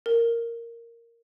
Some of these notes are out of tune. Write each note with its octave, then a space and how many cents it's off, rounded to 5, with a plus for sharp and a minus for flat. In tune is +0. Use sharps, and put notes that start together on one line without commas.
A#4 -5